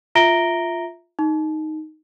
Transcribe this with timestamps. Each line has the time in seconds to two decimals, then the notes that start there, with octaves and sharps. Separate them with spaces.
0.15 F4 E5 A#5 A#6 D7 G7
1.19 D#4